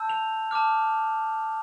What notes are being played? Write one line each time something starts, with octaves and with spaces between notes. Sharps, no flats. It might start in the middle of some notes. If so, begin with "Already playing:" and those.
Already playing: A5 E6 G6
F7
A5 D6 F6